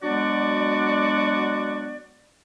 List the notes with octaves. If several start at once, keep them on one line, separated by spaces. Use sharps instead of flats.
F#3 G#3 B3 D4 F#4 D5